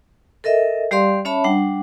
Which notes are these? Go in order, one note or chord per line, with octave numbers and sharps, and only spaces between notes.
A4 A#4 D#5 E5
G3 G4 D5 F5 C6
C#4 C#5 E5 A5 B5
G3 D4 F#5